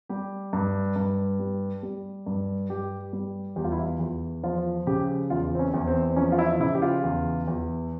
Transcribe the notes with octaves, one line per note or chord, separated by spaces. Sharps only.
G3 G4
G2
G2
G3
G3
G2
G2 G4
G3
E2 G4
F4
E4
F4
E2
F3 F4
C#3 G4
E2 F4
C4
C#4
E2
C4
C4
F3 C#4
F4
E4
C#3 E4
G4
F4
E2
E2